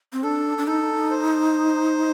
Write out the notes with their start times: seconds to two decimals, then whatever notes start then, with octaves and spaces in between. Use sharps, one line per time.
0.13 C4
0.23 D4 A4
0.58 D4
0.67 D#4 A4
1.11 C5